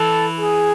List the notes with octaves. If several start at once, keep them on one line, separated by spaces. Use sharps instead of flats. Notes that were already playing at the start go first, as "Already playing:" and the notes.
Already playing: E3 A4
G#4